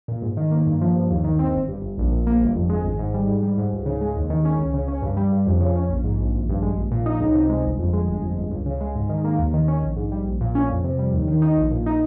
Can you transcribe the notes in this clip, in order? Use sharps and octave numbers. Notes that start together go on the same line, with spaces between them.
A#2
G#2
D#3
A#3
G2
F3
G2
D#2
D#3
C4
G1
G2
G1
A#1
A#2
A#3
G1
F2
G#3
G#1
G#2
G3
G#2
G3
G#2
C#2
C#3
G#3
D#2
D#3
C#4
C#2
C#3
C#4
G2
G3
G2
F2
C#3
C#4
A#1
G#2
A#1
G#1
G2
G#3
A#1
A#2
D#4
C#2
C3
G#3
G1
F2
G#3
G1
F2
G1
C#2
C#3
G#3
G#2
D#3
A#3
D#2
D#3
C#4
A#1
G#2
G3
A#1
A#2
C#4
F2
C3
G3
D#2
D#3
D#4
A#1
A#2
D#4